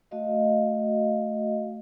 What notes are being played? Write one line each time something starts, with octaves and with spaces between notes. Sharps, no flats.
A3 F#4 D#5 F5